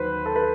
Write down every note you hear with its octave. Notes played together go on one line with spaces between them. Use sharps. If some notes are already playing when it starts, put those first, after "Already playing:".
Already playing: D#2 D#3 F#3 B4 C5
A4
B4